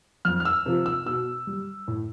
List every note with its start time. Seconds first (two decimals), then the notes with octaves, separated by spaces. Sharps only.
0.25 F2 F6
0.40 F6
0.45 E6
0.66 C3 F3
0.86 E6
1.06 B2 E6
1.47 G3
1.88 A2